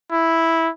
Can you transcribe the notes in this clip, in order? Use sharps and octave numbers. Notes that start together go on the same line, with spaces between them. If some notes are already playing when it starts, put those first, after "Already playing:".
E4